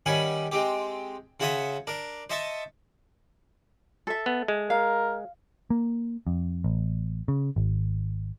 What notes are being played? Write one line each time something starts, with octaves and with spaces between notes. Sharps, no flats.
D#3 G3 C#4 F#5 G#5 B5
G#3 C4 G4
C#3 F#4 C5 C#5 E5 D#6
D4 A#4
C5 D#5 E5 A5 C#6
A4 E5
B3
G#3
A#4 F5
A#3
F2
A1
C#3
G#1